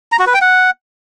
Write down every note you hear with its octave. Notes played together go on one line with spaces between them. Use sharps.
A#5
F#4
B4
G5
F#5